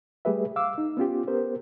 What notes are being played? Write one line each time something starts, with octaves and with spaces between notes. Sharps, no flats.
G3 A3 G4 G#4 B4 E5
F5 D6 E6
D#4
B3 C#4 F4 G4
B3 G4 A#4 C5